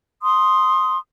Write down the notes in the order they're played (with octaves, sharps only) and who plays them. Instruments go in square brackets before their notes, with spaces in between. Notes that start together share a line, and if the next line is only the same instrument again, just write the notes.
[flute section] C6 D#6